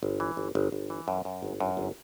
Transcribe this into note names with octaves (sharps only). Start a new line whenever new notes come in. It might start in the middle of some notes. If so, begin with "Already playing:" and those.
G1
E3
G1
G1
G1
E3
F#2
F#2
G1
F#2
G1